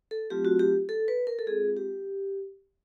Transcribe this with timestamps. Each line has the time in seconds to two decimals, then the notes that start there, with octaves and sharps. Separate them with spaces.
0.11 A4
0.30 F#3 A3 C4 F4 G4
0.45 F#4
0.59 G4
0.89 A4
1.08 B4
1.27 A#4
1.39 A4
1.46 G#3 C4 F4 G#4
1.77 G4